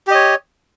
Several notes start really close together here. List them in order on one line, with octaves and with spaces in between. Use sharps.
G4 D#5 C#5